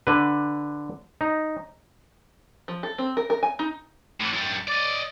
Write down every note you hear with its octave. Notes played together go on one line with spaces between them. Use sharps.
D3 B4
D#4
F3
A4
C4
A#4
A#4
G#5
D#4
A2 E3
F#2 G3
D5 D#5